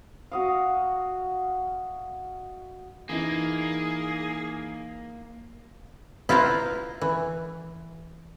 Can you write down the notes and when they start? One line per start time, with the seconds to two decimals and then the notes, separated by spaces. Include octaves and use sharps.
0.32 F#4 D#5 F5
3.09 E3 A#3 D#4 G#4
6.29 E4 F4 B4 C5 A#5
7.01 E3